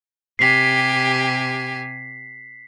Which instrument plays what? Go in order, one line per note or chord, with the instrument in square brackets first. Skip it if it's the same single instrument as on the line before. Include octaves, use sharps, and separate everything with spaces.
[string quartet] C3 G4 G#5 [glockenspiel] B6 C7